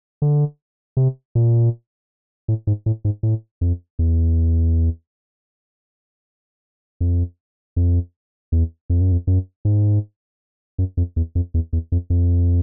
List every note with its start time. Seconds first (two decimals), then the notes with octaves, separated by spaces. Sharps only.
0.22 D3
0.97 C3
1.35 A#2
2.48 A2
2.67 G#2
2.86 A2
3.05 G#2
3.23 A2
3.61 F2
3.99 E2
7.01 F2
7.76 F2
8.52 E2
8.90 F2
9.01 F#2
9.12 F2
9.27 F#2
9.65 G#2
10.78 F#2
10.97 F2
11.16 E2
11.35 F2
11.54 E2
11.73 E2
11.92 F2
12.10 F2